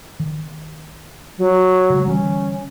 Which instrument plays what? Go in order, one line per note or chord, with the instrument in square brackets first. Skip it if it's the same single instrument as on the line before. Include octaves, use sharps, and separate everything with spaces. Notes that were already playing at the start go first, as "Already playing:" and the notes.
[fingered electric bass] D#3
[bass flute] F#3
[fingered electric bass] C#3 G#3
[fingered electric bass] D3 E3 G3 [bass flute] C#4